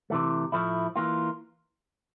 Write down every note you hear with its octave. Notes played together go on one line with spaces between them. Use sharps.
C3 E3 A3
A2 F3 A3 E4
E3 A#3 F4